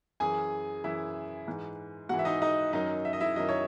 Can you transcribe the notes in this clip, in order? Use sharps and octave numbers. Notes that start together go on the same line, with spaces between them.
F#2 E3 G#4 G#5
F#2 E3 E4 E5
G#2 E3
G#2 E3 F#4 F#5
E5
D#4 D#5
D#4 D#5
F#2 D#3 F#3 D#4 D#5
E5
D#5
E4 E5
F#2 D#3 F#3 D#5
C#5